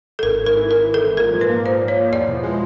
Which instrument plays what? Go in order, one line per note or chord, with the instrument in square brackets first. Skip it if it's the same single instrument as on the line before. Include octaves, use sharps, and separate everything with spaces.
[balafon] A4
[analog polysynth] G#1 [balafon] A#4
[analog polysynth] G#2
[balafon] A#4
[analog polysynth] E3
[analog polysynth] G#1 [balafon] A#4
[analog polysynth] G#1
[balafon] A4
[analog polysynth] G#2
[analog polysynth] A#2 [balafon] A#4
[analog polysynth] F3
[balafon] B4
[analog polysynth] A#3
[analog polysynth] A#2 [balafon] C5
[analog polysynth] A#2
[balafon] C#5
[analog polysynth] F3
[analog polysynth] E2 [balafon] D5
[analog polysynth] B2
G#3